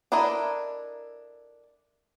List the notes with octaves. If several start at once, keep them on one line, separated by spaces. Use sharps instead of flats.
D4 E4 A4 A#4 D#5